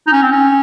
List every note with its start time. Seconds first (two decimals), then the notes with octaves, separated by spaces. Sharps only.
0.07 D#4
0.12 C#4
0.23 C4
0.32 C#4